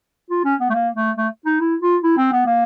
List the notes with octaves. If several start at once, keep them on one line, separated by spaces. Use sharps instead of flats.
F4
C#4
B3
A3
A#3
A3
A3
D#4
E4
F4
E4
C4
B3
A#3